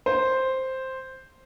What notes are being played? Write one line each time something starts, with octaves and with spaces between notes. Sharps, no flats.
C5